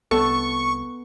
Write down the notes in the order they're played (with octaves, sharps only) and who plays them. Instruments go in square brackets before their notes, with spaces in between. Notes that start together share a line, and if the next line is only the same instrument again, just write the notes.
[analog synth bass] C2 [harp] B3 [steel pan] A4 [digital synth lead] C#6